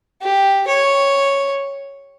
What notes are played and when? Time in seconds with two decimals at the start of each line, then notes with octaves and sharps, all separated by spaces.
0.21 G4
0.67 C#5